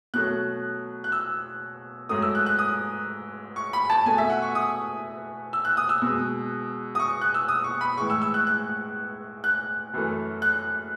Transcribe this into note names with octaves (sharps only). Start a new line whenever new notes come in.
B2 F#3 A3 F#6
F#6
E6
G#2 F#3 A3 D#6
E6
F#6
F#6
D#6
C#6
B5
A5
B2 A3 G#5
E5
F#5
C#6
D#6
E6
F#6
D#6
E6
B2 G#3
D#6
C#6
F#6
E6
D#6
C#6
B5
A2 E3 G#3 C#6
E6
E6
F#6
F#6
F#6
F#2 E3 A3
F#6